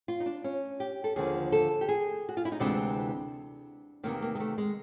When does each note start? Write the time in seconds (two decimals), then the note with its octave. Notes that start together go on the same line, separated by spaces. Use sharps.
0.08 F4
0.20 D#4
0.26 D4
0.44 C#4
0.80 G4
1.04 A4
1.16 D#2 D3 F3 G#4
1.52 A4
1.81 G4
1.89 G#4
2.29 F#4
2.37 F4
2.45 E4
2.52 D#4
2.60 D2 C3 E3 G#3 D4
4.03 E2 C3 D#3 A#3
4.22 A#3
4.35 G#3
4.40 A3
4.58 G#3